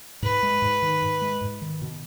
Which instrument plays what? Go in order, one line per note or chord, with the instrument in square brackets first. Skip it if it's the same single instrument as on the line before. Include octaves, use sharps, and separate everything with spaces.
[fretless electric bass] G#2 [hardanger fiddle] B4
[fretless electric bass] G#3
G#2
D#3
G#2
G#3
G#2
D#3
B2